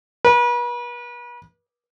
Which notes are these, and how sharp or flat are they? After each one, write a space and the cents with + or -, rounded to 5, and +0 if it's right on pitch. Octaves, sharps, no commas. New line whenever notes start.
B4 -40